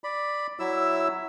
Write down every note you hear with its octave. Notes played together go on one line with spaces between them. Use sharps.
D5 B5
F#3 E4 E5 E6